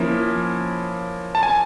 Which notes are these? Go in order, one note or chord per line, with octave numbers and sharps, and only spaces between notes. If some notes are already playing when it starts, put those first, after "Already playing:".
Already playing: F3 A#3 C#4 E4
A5
G#5